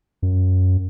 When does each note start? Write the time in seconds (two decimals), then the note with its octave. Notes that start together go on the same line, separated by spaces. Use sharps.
0.22 F#2